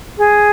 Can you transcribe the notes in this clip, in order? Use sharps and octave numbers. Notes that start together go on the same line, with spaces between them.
G#4